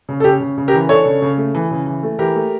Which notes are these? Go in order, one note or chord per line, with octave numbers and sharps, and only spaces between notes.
C#3
A4
C#3 G4
C#3
C#3
G4 A#4
E3
D4 A4 C#5
C#3
C#3
A3
E3
C#3
E3
A3
E3 G4 A#4
A3